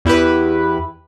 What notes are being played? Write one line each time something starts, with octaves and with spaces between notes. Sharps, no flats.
E2 E4 G4 B4